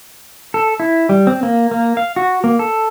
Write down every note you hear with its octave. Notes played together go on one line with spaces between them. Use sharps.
A4
E4
G3
C4
A#3
A#3
F5
F#4
A#3
A4